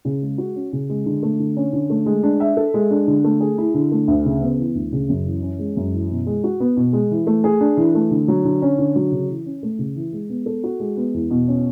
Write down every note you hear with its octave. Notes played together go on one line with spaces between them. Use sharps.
C#3
G#3
F#4
C#4
C#3
G#3
D3
A3
D3
C#4
D3
A3
G#3
D4
E5
A4
G#3
D4
D3
A3
G#4
E4
D3
A3
D2
C#3
B3
E3
D2
C#3
F#2
E3
C#4
G#3
F#2
E3
B2
G#3
F#4
B3
B2
G#3
E3
A3
G#4
D4
E3
A3
D3
F#3
D3
C#4
D3
F#3
C#3
E3
C#4
A3
C#3
E3
G#3
B3
A4
F#4
G#3
B3
E2
B2
C#4